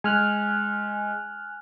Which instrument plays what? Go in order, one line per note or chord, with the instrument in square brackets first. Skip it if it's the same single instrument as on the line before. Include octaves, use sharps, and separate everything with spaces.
[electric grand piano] G#3 [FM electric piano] G#5 F6 F#6